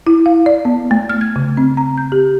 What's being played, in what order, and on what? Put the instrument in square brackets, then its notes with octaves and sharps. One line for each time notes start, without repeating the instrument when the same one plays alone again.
[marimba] E4
F5
D5
B3
A3
F6
G#6
C#3
C4
A#5
G6
G4